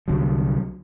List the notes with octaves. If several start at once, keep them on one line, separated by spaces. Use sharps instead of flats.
C2 D3 F#3